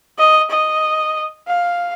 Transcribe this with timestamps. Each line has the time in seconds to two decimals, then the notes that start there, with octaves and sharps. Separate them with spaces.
0.19 D#5
0.51 D#5
1.48 F5